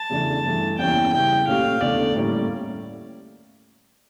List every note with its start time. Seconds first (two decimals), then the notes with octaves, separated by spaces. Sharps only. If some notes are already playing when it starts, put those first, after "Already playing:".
Already playing: A5
0.09 E2 C#3 E3 A3 D4
0.43 G2 E3 A3
0.78 E2 E3 G3 A#3 C#4 G5
1.12 C#3 G3 C#4 E4 G5
1.47 A#2 A3 C#4 G4 F5
1.81 E2 D3 A3 D5
2.15 A2 G3 A#3 C#4